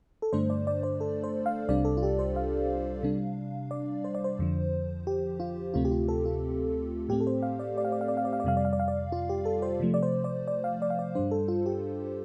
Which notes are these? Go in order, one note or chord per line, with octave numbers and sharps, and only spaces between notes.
A4
G2 D3 A3 D4 C5
D5
D5
C5
A4
C5
F5
C2 C3 G3 D4 D5
A4
F4
G4
C5
F5
C3 G3 D4
D5
C5
D5
C5
F2 D3 F3
G4
F4
D2 C3 A3 C4 F4
G4
F4
A4
F4
A2 A3 C4 G4
A4
C5
F5
D5
D5
F5
D5
F5
D5
F5
D5
F5
D5
F2 C3 G3 F5
D5
F5
D5
F5
D5
F4
G4
A4
C5
C3 F3 A3
D5
C5
D5
D5
F5
D5
F5
D5
G2 G3 D4 C5
A4
F4
G4